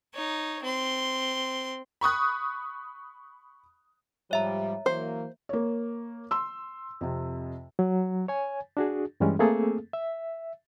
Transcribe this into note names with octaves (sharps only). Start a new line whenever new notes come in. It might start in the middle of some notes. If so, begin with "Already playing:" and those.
D#4 C#5
C4 C6
B5 C#6 D#6 F#6
G#2 F3 G3 C#5 E5 A#5
E3 F#3 A#3 C5
A#3 C#5
C6 E6
F2 C3
F#3
C#5 G#5
D4 F#4 G#4
G2 E3 G3 G#3 C#4
A3 A#3 C4 G#4 A4
E5